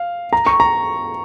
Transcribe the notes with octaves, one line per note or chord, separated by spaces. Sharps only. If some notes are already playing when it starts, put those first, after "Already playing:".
Already playing: F5
A#5
C#6
A#5